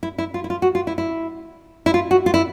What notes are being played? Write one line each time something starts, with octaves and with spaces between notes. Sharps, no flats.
E4
E4
F4
E4
F4
F#4
F4
E4
E4
E4
F4
F#4
F4
E4